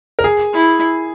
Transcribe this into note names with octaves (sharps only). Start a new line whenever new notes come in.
A#4
G#4
E4